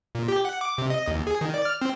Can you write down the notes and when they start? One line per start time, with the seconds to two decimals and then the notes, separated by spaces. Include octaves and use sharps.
0.15 A#2
0.28 G4
0.45 F#5
0.61 D6
0.78 C3
0.90 D#5
1.08 D#2
1.27 G#4
1.41 D#3
1.54 D5
1.65 F6
1.82 C4